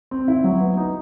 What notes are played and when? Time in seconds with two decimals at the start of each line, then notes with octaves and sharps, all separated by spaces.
0.11 C4
0.28 E4
0.44 F#3
0.61 B3
0.77 D#4